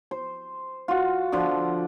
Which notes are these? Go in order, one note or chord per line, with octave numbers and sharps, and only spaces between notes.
C5
F4 F#4
D3 F3